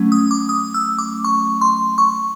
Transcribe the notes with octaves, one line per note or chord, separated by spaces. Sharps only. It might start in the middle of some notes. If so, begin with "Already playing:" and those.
Already playing: F#3 A3 C#4
D#6
D6
D#6
E6
D6
C#6
C6
C#6